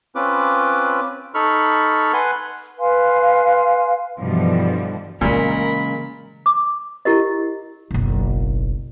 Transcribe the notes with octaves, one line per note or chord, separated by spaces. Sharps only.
C4 C#4 F4 B4 D6
D#4 A4 B5 C#6 F6
B4 F#5 G#5 C6
B4 F5 G#5 C6
G2 B2 D3 E3 F3 G3
A#2 C#3 E3 G#3 A#3 A#4 B5
D6
E4 G4 A#4 D#5
F#1 B1